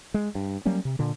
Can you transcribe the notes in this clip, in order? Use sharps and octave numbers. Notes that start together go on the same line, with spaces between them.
G#3
G2
F#3 G3 A#3 C#4
C3
A#2 D3